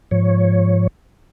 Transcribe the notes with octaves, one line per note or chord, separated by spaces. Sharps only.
G#2 F3 C#5